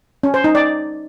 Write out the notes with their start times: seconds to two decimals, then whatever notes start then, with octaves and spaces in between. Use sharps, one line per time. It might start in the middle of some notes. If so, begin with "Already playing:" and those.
0.23 C#4
0.34 C5
0.44 D#4
0.55 D5